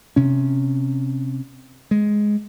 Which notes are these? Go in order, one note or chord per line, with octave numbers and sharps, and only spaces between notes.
C3 C#4
G#3